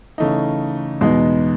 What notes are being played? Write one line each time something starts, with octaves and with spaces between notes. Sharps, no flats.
C#3 E3 A3 D#4
E2 B2 G#3 B3 D#4